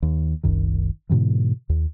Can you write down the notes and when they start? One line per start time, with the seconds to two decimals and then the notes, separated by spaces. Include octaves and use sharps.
0.02 D#2
0.43 F#1 C2 F#2 D#3
1.09 G#2 B2 D3 E3
1.69 D#2